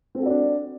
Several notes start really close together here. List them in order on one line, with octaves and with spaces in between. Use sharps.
C4 A4 F#4 D5 D4